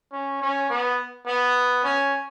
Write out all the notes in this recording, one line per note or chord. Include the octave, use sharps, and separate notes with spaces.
C#4
C#4
B3
B3
C#4